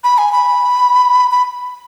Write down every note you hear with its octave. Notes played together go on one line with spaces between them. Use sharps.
B5
G#5
B5
B5